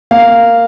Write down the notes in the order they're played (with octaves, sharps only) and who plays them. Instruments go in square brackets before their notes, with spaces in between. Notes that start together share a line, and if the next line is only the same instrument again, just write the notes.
[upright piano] A#3 F5